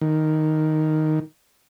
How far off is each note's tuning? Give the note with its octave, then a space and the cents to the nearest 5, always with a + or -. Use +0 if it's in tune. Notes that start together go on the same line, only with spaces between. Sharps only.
D#3 +0